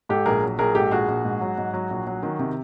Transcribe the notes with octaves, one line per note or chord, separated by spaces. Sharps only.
G#2 G4 A4
A#1 G#4 A#4
F#3
A#1 G#4 A#4
G#2 G4 A4
A#1 F#4 G#4
A#1
G#2
F#3
G#2
F#3
A#1
F#3
D#3
C3